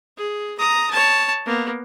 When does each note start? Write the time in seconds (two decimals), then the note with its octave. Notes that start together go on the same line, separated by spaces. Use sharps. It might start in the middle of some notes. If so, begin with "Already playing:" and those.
0.17 G#4
0.59 A#5 D#6
0.91 C#5 A5
1.46 A#3 B3